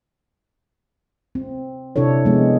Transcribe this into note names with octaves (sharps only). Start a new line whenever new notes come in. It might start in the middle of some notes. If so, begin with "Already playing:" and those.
C4
C3 D4 E4 A4 C#5
F3 G#3 B3